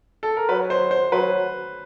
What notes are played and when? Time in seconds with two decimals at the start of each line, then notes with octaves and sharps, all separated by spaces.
0.23 A4
0.37 A#4
0.49 F#3 B4
0.70 C5
0.91 C5
1.12 F#3 B4